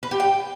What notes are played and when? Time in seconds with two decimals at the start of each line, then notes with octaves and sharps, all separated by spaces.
0.03 B4
0.11 G4
0.20 G5